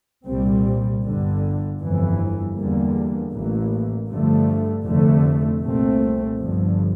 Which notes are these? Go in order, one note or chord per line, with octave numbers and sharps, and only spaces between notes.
C2 A#2 G3 C4
G1 G2 D3
G1 F2 E3
E2 D3 G3 A#3
A1 A2 E3 A#3
G2 D3 F3 A3
F1 F2 D3 A3
C2 A#2 A3 C4
G1 G2 D3 F3